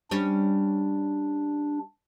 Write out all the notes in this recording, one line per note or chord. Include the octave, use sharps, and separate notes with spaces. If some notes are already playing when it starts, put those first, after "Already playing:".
G3 C#4 D4